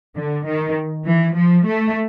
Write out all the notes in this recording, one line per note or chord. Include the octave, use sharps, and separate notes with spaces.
D3
D#3
E3
F3
A3